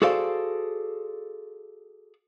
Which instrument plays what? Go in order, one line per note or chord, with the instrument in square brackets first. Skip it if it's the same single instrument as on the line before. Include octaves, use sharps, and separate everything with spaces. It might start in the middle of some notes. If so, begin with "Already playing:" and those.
[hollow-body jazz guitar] F#4 G#4 A4 C5 D5 F5